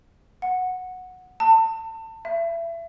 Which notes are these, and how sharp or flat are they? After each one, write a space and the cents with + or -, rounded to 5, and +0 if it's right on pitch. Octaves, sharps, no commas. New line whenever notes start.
F#5 -10
A5 +30
E5 +30